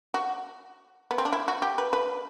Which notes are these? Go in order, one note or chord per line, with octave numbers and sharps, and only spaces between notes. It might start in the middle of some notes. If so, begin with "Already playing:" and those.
F#4
B3
C4
D4
E4
F#4
G4
B4
B4